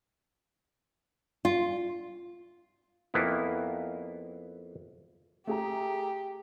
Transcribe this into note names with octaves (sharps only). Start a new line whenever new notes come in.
F4
F2 A#3 B3 E4
A3 G4 G#4 A#5